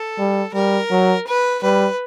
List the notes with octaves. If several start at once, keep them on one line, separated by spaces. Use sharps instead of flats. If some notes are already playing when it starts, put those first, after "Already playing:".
Already playing: A4
G3
G3 A#4
F#3
B4
G3 B4